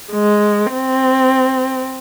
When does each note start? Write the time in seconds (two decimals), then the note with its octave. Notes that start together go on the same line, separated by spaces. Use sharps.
0.13 G#3
0.73 C4